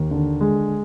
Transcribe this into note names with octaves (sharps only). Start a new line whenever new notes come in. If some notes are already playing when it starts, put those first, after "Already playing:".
Already playing: D#2
D3
G#3